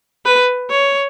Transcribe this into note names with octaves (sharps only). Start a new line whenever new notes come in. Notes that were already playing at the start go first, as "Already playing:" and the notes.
B4
C#5